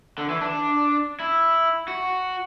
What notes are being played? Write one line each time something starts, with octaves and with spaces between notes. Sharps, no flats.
D3
E3
D4
E4
F#4